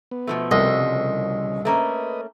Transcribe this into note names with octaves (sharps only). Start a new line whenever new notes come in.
B3
B2 F3 A3
C2 D#5
C#3
A3 A#3 C#4 B4 D#5